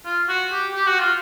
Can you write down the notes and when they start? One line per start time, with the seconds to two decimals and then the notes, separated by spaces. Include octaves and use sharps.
0.05 F4
0.29 F#4
0.52 G4
0.74 G4
0.87 F#4
1.00 F4